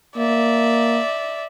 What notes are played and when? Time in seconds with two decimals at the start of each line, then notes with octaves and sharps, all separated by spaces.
0.17 A#3 D5 E5